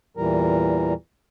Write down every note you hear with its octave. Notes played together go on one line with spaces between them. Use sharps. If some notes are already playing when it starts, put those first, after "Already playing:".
E2 A#2 E3 G3 A#4